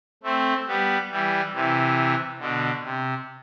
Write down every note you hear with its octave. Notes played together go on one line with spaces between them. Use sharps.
A3 C4
G3 B3
E3 G3
C3 E3
B2 D3
C3